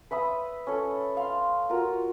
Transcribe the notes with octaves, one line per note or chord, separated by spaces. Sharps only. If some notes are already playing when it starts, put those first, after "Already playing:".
B4 E5 B5 D#6
C#4 A4
F5 C6
F4 F#4 A#4